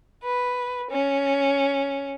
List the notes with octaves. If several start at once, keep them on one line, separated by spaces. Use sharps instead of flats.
B4
C#4